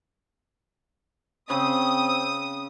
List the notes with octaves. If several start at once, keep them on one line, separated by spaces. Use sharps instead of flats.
C#3 C4 D#6